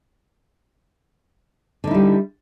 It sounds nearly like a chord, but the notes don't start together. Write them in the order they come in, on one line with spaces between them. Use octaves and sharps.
D3 D#4 E4 G3